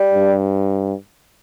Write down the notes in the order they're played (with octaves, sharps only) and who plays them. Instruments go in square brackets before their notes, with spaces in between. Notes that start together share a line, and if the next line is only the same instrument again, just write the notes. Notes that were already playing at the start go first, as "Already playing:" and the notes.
Already playing: [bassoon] G3
[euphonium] G2